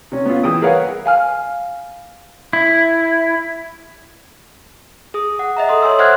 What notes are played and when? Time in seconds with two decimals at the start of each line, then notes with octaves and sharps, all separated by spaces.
0.12 C3 C#4
0.26 B3 C#4 F4
0.43 E3 G#4 G5 D#6
0.62 G#4 A#4 B4 C#5 F5 F#5
1.06 F5 G#5 F6
2.53 E4
5.14 G#4 D#6
5.39 F#5
5.57 D#5 E5 A#5
5.69 A4 C6 D#6
5.82 C#5 G#5 C6 E6
5.99 C5 E5 F#5 F6 F#6 G#6